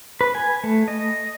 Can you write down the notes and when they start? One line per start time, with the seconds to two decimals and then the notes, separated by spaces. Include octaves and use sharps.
0.21 B4
0.35 G#5
0.64 A3
0.88 D#5